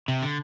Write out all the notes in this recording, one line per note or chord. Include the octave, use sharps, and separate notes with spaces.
C3
D3